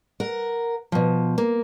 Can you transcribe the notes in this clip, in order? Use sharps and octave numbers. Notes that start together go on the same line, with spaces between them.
A#4 F#5
B2 F3
A#3